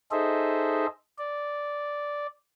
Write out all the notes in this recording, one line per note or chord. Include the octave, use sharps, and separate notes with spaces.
D#4 G#4 A4 C5 D#5 E5
D5